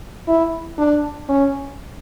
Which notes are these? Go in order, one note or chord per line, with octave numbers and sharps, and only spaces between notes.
E4
D4
C#4